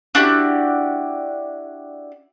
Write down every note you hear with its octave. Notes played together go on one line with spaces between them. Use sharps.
D4 E4 F#4 G4